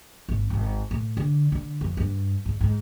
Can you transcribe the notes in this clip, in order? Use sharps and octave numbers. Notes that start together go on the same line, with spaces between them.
G#1
G#1
A2
D3
D3
F2
G2
G#2
G#2